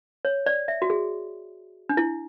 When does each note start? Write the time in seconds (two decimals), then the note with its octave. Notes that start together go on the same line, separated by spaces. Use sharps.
0.25 C#5
0.46 D5
0.68 E5
0.82 F#4
0.90 G#4
1.89 D4
1.97 E4